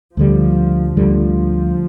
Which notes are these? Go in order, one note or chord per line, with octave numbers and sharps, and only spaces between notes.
D2 D3 F3 G3
D2 D3 F3 G3